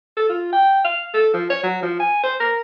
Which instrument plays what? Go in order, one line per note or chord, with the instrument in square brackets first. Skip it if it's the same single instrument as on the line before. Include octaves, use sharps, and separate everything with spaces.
[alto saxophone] A4
F4
G5
F5
A4
F3
C#5
F#3
F3
G#5
C5
A#4